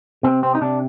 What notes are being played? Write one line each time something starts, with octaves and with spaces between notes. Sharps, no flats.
C3 C4
C4
D#4
C3 D4